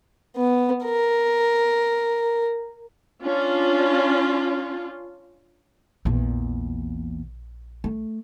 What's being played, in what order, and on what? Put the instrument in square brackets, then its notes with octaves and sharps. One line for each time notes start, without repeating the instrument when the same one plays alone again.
[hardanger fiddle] B3
A#4
[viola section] C#4 D4 F4
[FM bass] A#1 [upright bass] E2 A#2
[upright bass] A3